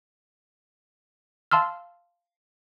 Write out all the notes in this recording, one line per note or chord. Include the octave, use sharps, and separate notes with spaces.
F5 A5 C6 E6 F6